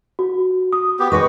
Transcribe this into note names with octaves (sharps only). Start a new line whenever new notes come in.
F#4
D#6
B3 G4
G#3 F#4 B4 C#5